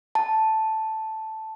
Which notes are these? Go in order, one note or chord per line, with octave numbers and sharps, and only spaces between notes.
A5